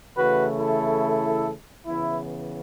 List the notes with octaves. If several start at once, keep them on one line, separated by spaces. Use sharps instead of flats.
C#3 E3 A3 F#4 B4
E4 A4
C#3 E3 B3 E4